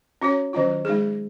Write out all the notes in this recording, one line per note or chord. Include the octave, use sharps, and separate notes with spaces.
C#4 F#4 C#5
D#3 F#3 C#4 F4
G#3 D#4 G#4